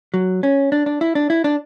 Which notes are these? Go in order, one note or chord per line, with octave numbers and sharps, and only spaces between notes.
F#3
C#4
D4
D4
E4
D4
E4
D4